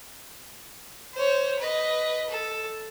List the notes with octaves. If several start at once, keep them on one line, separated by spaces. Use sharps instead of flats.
C5 C#5
B4 D#5
A4